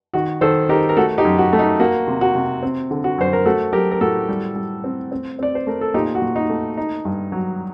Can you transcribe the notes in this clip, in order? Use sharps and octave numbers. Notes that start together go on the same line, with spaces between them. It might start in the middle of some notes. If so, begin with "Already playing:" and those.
D#3 F#4
D#3 A4 C5
D#4 G4 A#4
A#4
A3 F#4 A4
D#4 G4
F#2
F#4
A3
D#4
A#3 F#4
C3
F#4
C3
C4
D3
F#4
F#2 C5
A#4
A3 F#4 A4
F#3 G4 A#4
A#4
A2 F#4 A4
G3
G3
C4
C4
C4 D5
C5
A3 A#4
A4
A#2 D#4 G4
F#4
A#2
D#4
A3
D#4
G2
F#3